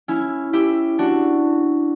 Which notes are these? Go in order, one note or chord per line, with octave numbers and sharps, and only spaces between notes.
C#4 E4
E4 G4
D4 F#4